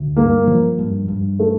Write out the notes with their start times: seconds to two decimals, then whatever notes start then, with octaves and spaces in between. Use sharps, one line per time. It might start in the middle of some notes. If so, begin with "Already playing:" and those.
Already playing: D2
0.16 G2 A#3
0.47 F3
0.79 G2
1.08 G2
1.39 A3